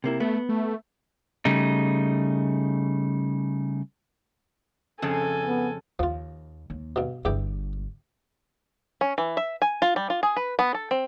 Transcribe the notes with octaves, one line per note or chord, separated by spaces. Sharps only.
C3 A#3 E4
A3 B3
A3
C#3 G3 A3 D#4
F2 C#3 A4 G#5
B3
D#2 F3 F4
D#2
G2 B2
G1 E2 G2 G4 G5
C#4
E3
E5
G#5
F4
G3
F4
G#4
B4
B3
A4
C4